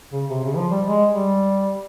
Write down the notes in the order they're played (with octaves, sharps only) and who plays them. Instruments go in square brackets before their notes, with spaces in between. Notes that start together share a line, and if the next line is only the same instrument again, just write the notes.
[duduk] C#3
C3
C#3
F3
G3
G#3
G3